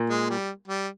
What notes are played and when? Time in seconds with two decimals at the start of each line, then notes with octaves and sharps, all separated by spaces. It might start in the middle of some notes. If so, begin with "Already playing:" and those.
Already playing: A#2
0.10 G#3
0.30 G3
0.67 G3